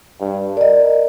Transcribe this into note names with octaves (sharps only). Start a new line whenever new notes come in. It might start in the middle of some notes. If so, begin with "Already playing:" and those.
G2
A#4 D5 D#5